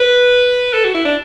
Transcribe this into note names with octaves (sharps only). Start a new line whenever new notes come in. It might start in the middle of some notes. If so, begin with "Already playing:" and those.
Already playing: B4
A4
F#4
E4
D4